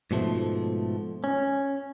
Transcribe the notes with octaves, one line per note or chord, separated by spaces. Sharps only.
G#2 B2 F3 A3
C#4